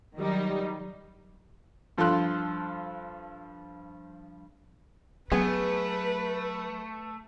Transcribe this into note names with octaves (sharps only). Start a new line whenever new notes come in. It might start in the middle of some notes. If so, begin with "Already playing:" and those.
D#3 F#3 G3 D#4
G2 F3 F4 A4 C6 F#6
F#3 A3 B3 G#4 B4